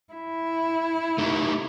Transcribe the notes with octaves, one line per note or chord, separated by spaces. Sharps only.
E4
A3 D#4 G4